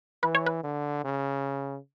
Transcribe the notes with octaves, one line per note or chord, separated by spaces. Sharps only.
E3 B4
C#5
B4
D3
C#3